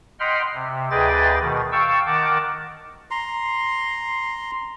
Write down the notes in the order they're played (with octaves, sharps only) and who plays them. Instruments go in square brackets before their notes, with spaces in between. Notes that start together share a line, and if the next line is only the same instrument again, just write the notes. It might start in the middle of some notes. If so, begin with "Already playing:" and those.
[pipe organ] D#5 F#5 G5 B5 C6 F6
C3
D2 G#4 B4 D#5 G5 A6
B2 D#3
F5 G5 A5 C#6 E6
D#3 A#4 F#5 A5 D6
[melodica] A#5 C6